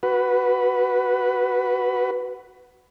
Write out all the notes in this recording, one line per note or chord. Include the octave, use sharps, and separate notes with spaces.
F#4 B4